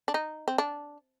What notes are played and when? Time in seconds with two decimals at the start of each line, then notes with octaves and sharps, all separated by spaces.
0.08 D4
0.14 D#4
0.48 C4
0.58 D4